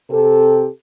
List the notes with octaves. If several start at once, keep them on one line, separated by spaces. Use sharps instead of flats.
C3 C4 G4 A4